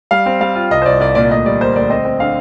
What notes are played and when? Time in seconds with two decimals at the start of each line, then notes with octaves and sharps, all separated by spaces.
0.11 G3 F5
0.26 C4
0.41 G3 F5
0.55 F4
0.71 C2 D#5
0.82 C5
0.86 C2 D5
1.00 C2 D5
1.15 A#2 D5
1.30 D2 D#5
1.46 G3 D5
1.61 A#3 C5
1.76 D2 D5
1.90 C4 D#5
2.05 C4
2.20 D3 F5